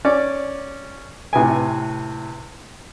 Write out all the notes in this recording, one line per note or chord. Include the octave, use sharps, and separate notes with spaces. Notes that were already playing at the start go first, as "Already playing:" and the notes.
C#4 D5
A2 C3 B4 G#5